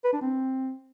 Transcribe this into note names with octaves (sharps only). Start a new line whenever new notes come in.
B4
D4
C4